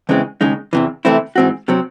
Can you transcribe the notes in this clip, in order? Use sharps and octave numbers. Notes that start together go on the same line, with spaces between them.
E2 C#3 E3 G#3 C4
D#2 C#3 G#3 D#4
E2 C3 E3
C3 E3 A3 C4 E4
G#2 E3 C4 F#4
C3 F#3 C4